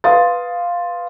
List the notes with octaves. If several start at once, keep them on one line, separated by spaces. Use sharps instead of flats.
B4 F5 C6 D#6 A6